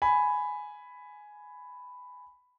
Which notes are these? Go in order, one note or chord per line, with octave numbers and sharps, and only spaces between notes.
G#5 B5